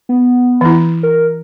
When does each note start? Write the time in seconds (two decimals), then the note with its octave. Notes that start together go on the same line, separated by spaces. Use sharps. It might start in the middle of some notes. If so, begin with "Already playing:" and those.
0.09 B3
0.61 E3 E4
1.03 A#4